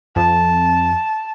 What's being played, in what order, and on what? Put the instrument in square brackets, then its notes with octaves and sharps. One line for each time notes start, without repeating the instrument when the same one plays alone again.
[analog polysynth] F2 [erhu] A5